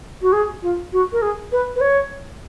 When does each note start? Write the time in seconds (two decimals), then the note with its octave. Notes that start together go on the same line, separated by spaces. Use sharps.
0.22 F#4
0.32 G#4
0.62 F4
0.92 F#4
1.12 A#4
1.22 G#4
1.52 B4
1.76 B4
1.81 C#5